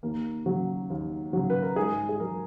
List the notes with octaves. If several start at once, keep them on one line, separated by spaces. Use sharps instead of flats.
D#2 A#3
C#3 F#3
D#2
C#3 F#3
B4
A#4
G#2 G#4
G#4
F#3 A#4